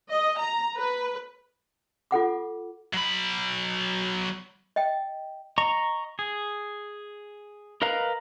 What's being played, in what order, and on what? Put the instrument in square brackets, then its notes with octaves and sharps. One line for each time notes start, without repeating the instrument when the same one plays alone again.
[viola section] D#5
A#5
B4
[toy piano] F4 A4 F#5 D6
[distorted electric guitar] F#3 B5
[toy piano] D#5 G5
[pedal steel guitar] D#5 A#5 C#6
G#4
A#4 B4 D#5 F5 A#5